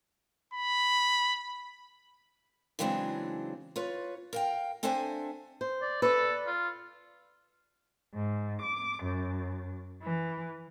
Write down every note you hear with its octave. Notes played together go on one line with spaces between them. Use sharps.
B5
C#3 E3 F#3 G#3 C4 D4
F4 B4 C#5
A#4 F5 G5
C4 D4 A4 C5 E5 G#5
C5
D5
A4 B4 D5
F4
G#2
D6
F#2
E3